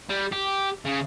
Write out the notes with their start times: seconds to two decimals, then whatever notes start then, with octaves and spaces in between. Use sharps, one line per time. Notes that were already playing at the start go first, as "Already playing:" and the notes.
0.10 G3
0.33 G4
0.85 C#3